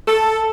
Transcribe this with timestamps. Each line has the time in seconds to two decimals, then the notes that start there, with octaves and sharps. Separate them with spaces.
0.07 A4